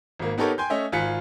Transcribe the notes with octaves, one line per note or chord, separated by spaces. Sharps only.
G#1 A#3
B3 D#4 G4 A4 A#4 C#5
G5 G#5 C6 G6
A3 C#4 D#5 E5
G#1 F4 G#5 F#6 B6 C#7